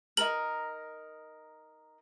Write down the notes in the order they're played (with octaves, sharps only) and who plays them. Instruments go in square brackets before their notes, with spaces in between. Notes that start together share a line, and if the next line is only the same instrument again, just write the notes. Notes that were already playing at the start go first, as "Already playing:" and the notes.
[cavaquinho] D#4 A#4 [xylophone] F#7